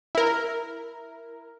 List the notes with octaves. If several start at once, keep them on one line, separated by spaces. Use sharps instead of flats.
E4 A#4